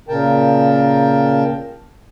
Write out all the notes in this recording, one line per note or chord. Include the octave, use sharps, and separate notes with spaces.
A#2 C#3 A#4 G5 A5